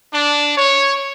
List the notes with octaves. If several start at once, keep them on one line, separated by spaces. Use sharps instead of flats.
D4
C#5